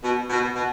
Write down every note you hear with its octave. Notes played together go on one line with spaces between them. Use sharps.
B2
B2
B2